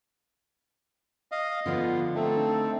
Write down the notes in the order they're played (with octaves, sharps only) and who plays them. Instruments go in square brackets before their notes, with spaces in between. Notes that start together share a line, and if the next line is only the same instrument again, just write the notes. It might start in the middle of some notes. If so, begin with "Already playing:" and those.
[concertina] D#5 F5
[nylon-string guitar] D3 F3 D4 [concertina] B3 F4
[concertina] A3 C4 [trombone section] D#4 A4